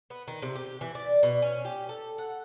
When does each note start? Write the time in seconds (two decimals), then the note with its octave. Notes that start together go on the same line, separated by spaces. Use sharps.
0.10 B3
0.28 D#3
0.42 C3
0.55 G4
0.81 E3
0.95 D5
1.23 B2
1.42 C#4
1.65 G4
1.89 A4
2.18 F#5